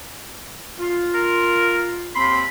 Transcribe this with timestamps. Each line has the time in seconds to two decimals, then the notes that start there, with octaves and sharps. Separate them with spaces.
0.79 F4
1.14 A#4
2.15 D#2 C4 B5 C6